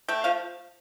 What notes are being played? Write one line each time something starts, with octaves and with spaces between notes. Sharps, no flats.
A3 G5
F3 F5